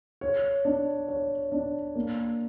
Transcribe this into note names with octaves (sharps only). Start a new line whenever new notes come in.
C#5
D4
C#5
D4
A#3